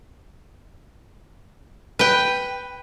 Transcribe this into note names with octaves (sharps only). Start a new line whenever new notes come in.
B4 G5